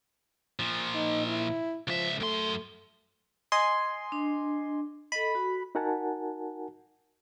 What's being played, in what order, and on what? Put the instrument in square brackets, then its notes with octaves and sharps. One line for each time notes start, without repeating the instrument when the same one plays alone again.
[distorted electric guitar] A#2 F3
[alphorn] D#4
E4
[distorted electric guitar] C#2 E5 [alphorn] F3
[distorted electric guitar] F#2 C6 [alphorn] A3
[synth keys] D#5 G#5 C6
[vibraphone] D4
[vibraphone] A4 D#5 [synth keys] B5
[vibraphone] F#4
[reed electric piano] D#4 F#4 A#4 F#5 G#5 A5